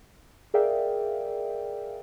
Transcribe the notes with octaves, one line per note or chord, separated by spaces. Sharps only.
G#4 A#4 D5 E5 F5 G5